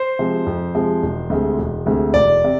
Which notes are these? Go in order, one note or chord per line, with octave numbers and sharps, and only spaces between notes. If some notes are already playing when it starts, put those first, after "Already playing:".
Already playing: C5
C3 F3 G#3
F2
C3 F3 G#3
E1
D2 C3 G#3
E1
D2 C3 G#3
E1 D5
C3